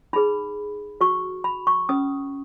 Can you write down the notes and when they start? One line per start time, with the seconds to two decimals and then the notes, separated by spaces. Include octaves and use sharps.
0.13 D#4 G#4 B4 B5
1.01 F#4 B4 C#6
1.44 B5
1.67 C#6
1.89 C#4 B4 D#6